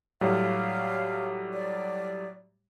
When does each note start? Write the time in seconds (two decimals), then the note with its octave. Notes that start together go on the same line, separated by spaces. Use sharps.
0.21 A2 F#3 G3 F5
1.53 D5